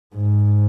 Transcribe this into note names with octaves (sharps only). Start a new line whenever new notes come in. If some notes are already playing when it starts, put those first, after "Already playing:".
G#2